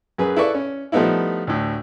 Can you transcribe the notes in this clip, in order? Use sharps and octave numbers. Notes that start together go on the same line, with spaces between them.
F#2 G#4 B4
E4 A4 B4 D5 C#6
C#4
F3 G3 A3 B3 D#4 E4
D2 A2